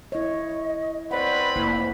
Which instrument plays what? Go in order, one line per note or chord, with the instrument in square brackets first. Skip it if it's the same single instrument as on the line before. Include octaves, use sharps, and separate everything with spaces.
[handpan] E4 C#5 [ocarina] D#5
[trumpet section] C4 B4 B5 [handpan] C#5 F#5 [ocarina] D5
[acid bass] F1 [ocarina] A#3 [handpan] E4